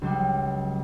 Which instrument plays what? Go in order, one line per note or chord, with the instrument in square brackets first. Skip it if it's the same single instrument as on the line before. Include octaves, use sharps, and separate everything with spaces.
[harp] C#2 F#3 G3